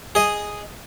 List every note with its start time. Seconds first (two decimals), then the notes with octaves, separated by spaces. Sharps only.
0.15 G#4 D#5